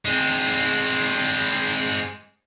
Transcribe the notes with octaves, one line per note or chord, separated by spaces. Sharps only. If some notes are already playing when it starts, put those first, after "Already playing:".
G#3 C4